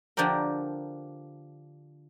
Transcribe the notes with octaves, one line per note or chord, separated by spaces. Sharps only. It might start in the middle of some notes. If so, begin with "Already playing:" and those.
D3 F3 D4 G4 A#4